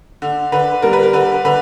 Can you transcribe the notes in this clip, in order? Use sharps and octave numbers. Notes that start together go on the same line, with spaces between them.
D3
D3 B4
G3 A#4
B4
A#4
D3 B4
D3 B4